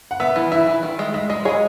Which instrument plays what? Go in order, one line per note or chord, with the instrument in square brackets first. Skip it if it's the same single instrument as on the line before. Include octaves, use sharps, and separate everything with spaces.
[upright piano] F#5
[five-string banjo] B3 [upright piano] E5
[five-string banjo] E3
[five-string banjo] E4 [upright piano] E5
[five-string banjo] E3
D#3
G#3
[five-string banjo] G#3 [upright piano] E5
[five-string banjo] G#3 [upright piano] D#5
[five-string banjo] G#4 [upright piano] C#5